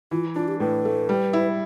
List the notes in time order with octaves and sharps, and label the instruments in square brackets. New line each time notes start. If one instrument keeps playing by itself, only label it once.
[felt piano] E3 [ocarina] F4
[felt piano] D4 [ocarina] F4
[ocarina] G4
[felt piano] A2 [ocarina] B4
[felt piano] A3
G3
E4